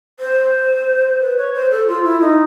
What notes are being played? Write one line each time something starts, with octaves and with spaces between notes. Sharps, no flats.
C5
B4
C#5
C5
A4
F4
E4
D#4